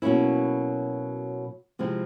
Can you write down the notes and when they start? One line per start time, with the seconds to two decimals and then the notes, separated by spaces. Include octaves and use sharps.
0.02 B2 F#3 A#3 C#4 E4
1.79 C3 F3 G#3 C4 E4